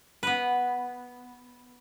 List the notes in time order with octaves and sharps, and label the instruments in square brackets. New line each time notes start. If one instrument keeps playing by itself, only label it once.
[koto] B3 B4